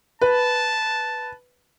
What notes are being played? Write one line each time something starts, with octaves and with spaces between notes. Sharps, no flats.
B4 A5